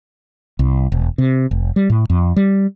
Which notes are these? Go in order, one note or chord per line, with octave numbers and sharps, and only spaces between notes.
C2
E1
C3
F1
G3
A2
F2
G3